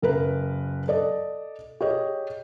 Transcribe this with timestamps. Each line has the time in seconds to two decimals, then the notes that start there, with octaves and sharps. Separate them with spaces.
0.02 F#1 A#4 B4
0.88 A4 D5 D#5
1.81 G4 G#4 C#5 D#5